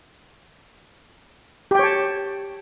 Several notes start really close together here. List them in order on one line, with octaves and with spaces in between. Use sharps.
G4 G5 C#5 A5